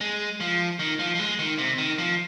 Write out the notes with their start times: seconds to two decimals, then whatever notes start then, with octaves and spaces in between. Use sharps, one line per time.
0.01 G#3
0.40 F3
0.79 D#3
0.99 F3
1.15 F3
1.19 G#3
1.39 D#3
1.58 C3
1.78 D#3
1.98 F3